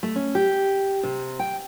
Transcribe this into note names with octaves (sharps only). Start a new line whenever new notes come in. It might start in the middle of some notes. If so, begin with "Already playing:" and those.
A3
C#4
G4
C3
G5